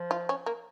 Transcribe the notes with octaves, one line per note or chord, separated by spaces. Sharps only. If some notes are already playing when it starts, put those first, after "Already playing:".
Already playing: F3
F4
C#4
A#3